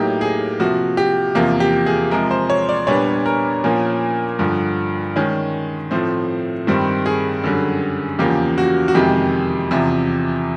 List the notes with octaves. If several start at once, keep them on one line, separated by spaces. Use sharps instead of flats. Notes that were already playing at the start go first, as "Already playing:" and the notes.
Already playing: A2 F#3 A#3 D#4 G4
G#4
C3 F3 A#3 F#4
G4
E2 C3 F3 A#3
G4
G#4
C3 F3 G#3 A#4
C5
C#5
D5
A#2 G3 B3 D4 C#5
A#4
A#2 F3 A#3 C#4
G2 D3 F3
D#3 G#3 C#4
A2 F3 A3 C4
G2 D#3 G3 C4
G#4
F#2 D3 G3
E2 C#3 F3 A#3 G4
F#4
F#4
F2 C3 D#3 G#3 G4
E2 C3 F3